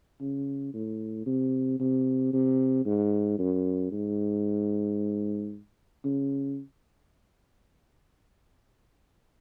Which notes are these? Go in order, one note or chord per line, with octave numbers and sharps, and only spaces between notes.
C#3
A2
C3
C3
C3
G#2
F#2
G#2
C#3